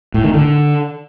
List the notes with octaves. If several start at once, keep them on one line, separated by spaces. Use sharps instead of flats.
A2
D#3
D3